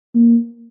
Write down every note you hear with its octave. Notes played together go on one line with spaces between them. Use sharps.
A#3